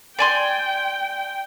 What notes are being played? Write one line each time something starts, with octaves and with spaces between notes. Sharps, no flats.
D5 G5 G#5 C6